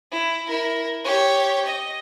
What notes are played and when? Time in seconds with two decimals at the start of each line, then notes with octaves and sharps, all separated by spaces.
0.12 E4
0.47 E4 A#4
1.05 G4 C#5
1.66 D#5